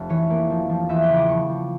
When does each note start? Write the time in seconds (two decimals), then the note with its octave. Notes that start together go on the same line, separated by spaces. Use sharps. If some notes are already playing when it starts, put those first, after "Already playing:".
Already playing: F1
0.09 E3 C#5
0.30 A#3
0.50 F3
0.69 F3
0.89 E2 E5
1.02 G5
1.09 C#3
1.15 D6
1.28 F3 C#6
1.49 F3